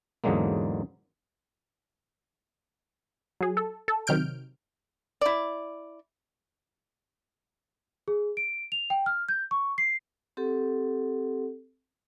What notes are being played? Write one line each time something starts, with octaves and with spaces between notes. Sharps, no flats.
E2 G#2 D3 F#3 G#3 A#3
F#3 G#4
A4
A4
C3 D#3 F#3 F6 G6 D7
E4 D5
G#4
D7
F7
G5
F6
G6
C#6
C7
C4 G4 A4 F#5